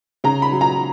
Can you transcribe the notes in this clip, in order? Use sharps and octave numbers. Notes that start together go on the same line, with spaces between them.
C#3 A#5
B5
F#3
A#5